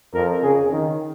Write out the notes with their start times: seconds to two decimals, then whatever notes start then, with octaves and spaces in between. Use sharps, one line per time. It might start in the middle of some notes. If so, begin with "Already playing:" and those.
0.14 F2 A#4
0.43 C#3 G#4
0.72 D#3